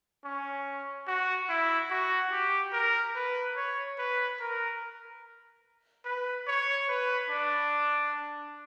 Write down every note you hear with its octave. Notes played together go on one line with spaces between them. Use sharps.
C#4
F#4
E4
F#4
G4
A#4
B4
C#5
B4
A#4
B4
C#5
B4
D4